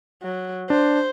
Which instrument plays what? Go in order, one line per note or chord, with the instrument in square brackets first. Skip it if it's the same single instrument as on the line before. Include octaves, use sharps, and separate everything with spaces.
[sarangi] F#3
[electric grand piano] D4 [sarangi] C5